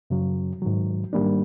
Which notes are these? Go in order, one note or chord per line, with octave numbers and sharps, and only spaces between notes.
F#2 C#3 F#3
G#2 D#3 F#3
G#2 D#3 G3 A#3 D4